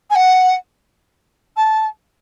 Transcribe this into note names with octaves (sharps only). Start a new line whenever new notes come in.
G#5
F#5
A5